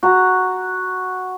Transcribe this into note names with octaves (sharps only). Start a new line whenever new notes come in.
F#4 A#5